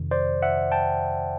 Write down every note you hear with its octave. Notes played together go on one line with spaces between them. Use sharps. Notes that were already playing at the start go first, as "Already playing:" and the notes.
Already playing: F2 C3 D#3
C5 D5
E5 F#5
G5 A5